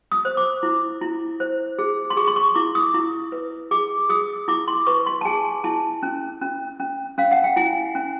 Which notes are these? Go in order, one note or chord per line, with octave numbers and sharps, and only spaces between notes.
D#6
C5
D6
E4
E4
C5
G#4
C6
G#4 C#6
C6
C#6
E4 D6
D#6
E4
B4
G#4 D6
G#4 D#6
E4 D6
C6
B4 C#6
C6
A5
G#4 G#5
E4 A5
C#4
C#4
C#4
C#4 F5
F#5
G5
E4 G#5
C#4